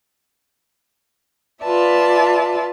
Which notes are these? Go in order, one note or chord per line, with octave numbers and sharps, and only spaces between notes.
F4 B4 D5 E5 A5